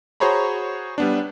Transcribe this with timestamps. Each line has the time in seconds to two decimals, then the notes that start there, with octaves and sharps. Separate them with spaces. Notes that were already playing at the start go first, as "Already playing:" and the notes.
0.20 F#4 G#4 C5 C#5 A#5 B5
0.98 G3 B3 D4